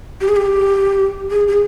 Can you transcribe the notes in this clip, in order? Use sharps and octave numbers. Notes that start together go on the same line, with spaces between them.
G4
G#4
G4
G#4
G#4